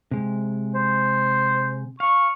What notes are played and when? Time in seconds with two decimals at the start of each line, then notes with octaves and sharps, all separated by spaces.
0.11 C3 G#3
0.74 C5
2.00 F5 C#6